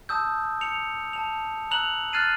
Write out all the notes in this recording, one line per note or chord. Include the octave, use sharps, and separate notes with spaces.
A5 D#6 E6 G6
C#7 F7
A5 F7
A#5 E6 F#6 F7 F#7
F6 F#6 G#6 A6 C7 D#7